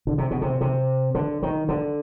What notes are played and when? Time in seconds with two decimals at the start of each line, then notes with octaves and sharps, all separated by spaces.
0.07 D3
0.18 C3
0.31 B2
0.41 C3
0.61 C3
1.15 D3
1.42 D#3
1.69 D3